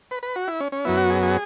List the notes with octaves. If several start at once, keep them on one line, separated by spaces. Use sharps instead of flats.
B4
B4
F#4
E4
C#4
C#4
F#2 F#3 B3 E4
F#4
G#4
G#4